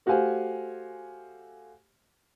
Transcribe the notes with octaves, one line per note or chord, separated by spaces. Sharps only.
A3 F#4 G4 C5 F5 G#5